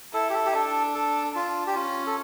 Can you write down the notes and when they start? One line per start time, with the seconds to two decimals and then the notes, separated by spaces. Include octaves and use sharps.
0.13 E4 A4
0.30 G4
0.34 A4
0.45 G4
0.54 D4 A4
0.95 A4
1.34 D4 F4
1.67 G4
1.76 C#4 F4
2.06 A4